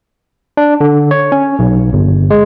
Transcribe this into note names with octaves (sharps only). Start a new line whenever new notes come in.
D4
D3
C#5
C#4
B1
G1
G#3